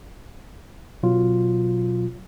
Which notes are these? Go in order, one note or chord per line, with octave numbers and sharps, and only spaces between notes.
B2 F#3 F4